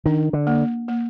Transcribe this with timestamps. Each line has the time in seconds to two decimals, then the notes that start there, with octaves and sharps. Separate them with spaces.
0.05 D#3 D4
0.33 D3
0.47 A#3
0.88 A#3